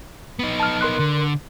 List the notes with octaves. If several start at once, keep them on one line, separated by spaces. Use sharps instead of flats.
B3 D#4
A5 F6
A#4 C6 F#6
D3